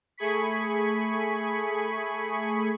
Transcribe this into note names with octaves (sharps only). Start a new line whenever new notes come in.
A3 G#4 G#5 B5 C#6 B6